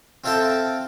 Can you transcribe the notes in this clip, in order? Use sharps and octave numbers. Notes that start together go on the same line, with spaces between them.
C4 F4 A4 E5 G5 A5